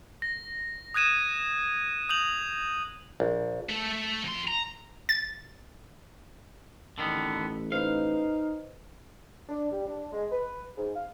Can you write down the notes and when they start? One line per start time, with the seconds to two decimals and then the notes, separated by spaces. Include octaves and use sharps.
0.22 A#6
0.94 D#6 F#6 G#6 D#7 E7
2.09 D#6 G6 F7 F#7
3.20 A#1
3.70 A3 A4
4.23 F2 C6
4.48 A#5
5.09 A6
6.98 A1 D3 D#3 B3
7.72 D#4 B4 C5 F5
9.49 D4
9.72 G3
9.86 D4
10.12 G#3
10.32 B4
10.77 G#2
10.96 F5